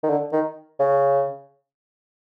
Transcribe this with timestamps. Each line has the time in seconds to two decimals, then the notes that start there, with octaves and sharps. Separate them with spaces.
0.04 D#3
0.10 D3
0.33 D#3
0.79 C#3